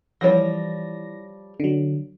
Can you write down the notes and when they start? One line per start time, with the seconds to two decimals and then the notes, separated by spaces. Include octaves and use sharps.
0.21 E3 F3 G3 C#5 A#6
1.60 D3 F#3